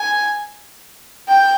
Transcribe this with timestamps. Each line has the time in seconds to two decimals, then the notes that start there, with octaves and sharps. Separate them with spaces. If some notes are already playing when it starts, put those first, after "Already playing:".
Already playing: G#5
1.28 G5